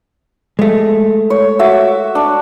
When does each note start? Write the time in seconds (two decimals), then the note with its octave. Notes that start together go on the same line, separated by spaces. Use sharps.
0.59 G#3 A3
1.30 C#5
1.59 F#4 E5 D6
2.15 D4